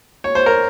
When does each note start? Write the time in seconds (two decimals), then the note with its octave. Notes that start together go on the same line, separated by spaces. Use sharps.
0.24 C#5
0.35 C5
0.46 A#4